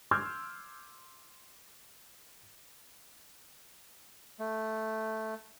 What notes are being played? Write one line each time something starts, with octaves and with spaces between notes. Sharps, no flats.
C6 D6 E6 F6 G6 G#6
A3